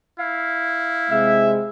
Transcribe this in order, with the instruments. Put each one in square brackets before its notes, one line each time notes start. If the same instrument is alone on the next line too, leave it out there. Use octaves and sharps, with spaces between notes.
[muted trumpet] E4 [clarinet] F5
[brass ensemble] C3 G#3 [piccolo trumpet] E5